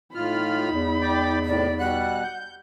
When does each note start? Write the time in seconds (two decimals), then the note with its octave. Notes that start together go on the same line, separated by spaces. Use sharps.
0.15 A2 D#4 F4 B5 F6
0.71 E2
1.02 D5 G5 D6
1.46 A2 C3 D5
1.79 B2 G3 F#5 F#6
2.24 G6